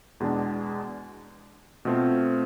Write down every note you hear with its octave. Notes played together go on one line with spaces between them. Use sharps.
E2 B2 G#3 D4
B2 A3 C4 F4